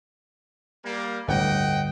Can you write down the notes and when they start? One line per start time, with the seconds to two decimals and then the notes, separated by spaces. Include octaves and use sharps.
0.84 G3 A#3
1.28 G1 D2 A2 D#5 F#5 G5